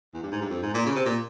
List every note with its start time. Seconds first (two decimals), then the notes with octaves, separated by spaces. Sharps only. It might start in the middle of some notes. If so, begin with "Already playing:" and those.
0.14 E2
0.23 G2
0.32 G#2
0.41 G2
0.50 F2
0.63 G#2
0.74 A#2
0.86 C#3
0.95 C3
1.05 A#2